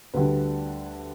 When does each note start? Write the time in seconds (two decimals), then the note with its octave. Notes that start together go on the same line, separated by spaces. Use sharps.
0.14 D2 D3 G3 B4